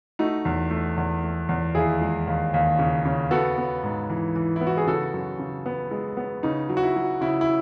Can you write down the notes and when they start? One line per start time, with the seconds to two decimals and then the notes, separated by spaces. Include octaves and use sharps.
0.19 A3 D#4 F#4
0.45 E2
0.70 A3
0.97 E2
1.23 A3
1.49 E2
1.75 D#2 E4 G#4
2.01 G#3
2.27 D#2
2.54 D#2
2.79 C#3
3.05 C#3
3.31 B3 F#4 A4
3.58 B3
3.84 G#2
4.10 E3
4.36 E3
4.56 E4
4.61 B3
4.67 F#4
4.77 G#4
4.87 C#3 F#4 A4
5.14 F#2
5.39 C#3
5.66 B3
5.91 G#3
6.17 B3
6.43 C#3 D#4
6.69 F#3
6.77 F#4
6.83 E4
6.96 F#3
7.21 C#3 E4
7.41 E4